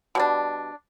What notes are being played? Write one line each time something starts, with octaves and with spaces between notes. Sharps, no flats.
B2 G3 D4